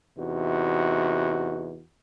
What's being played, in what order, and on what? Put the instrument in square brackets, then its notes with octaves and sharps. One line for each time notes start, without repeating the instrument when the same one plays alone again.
[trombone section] E2 C3 D#4 F#4